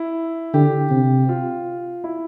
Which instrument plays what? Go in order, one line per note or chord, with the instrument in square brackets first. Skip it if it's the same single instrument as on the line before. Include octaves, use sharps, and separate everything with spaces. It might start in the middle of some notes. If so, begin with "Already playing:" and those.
Already playing: [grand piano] E4
[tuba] D3 [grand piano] G4
[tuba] C3
[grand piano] F4
E4